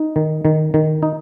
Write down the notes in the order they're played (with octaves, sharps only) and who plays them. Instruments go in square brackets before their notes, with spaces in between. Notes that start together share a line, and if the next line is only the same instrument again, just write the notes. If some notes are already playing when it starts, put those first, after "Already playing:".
Already playing: [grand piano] D#4
[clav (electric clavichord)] D#3
D#3
D#3
D#4